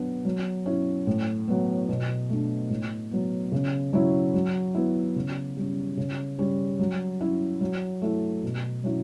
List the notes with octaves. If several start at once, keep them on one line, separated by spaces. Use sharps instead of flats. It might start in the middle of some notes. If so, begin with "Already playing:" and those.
Already playing: F#3 B3 D4
F#3
C#4 E4
A2
F#3 B3
B2
A3 D4
A2
F#3 B3
C#3
F#3 C#4 E4
F#3
B3 E4
C#3
G3 C#4
C#3
G3 C#4
F#3
C#4 E4
F#3
A3 E4
B2
F#3 C#4 E4